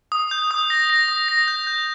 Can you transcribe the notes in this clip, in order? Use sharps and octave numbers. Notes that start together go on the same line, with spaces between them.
D#6
G6
D#6
A#6
A#6
D#6
A#6
G6
G6